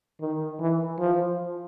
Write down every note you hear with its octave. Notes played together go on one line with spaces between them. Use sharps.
D#3
E3
F3